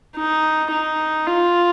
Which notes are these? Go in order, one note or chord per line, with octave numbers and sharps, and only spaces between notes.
D#4
D#4
F4